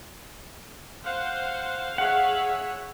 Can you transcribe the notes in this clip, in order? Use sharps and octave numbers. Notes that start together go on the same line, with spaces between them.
C5 F5 F#5
G#4 C#5 E5 F#5